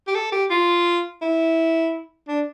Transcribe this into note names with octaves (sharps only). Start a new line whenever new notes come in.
G4
A4
G4
F4
E4
D4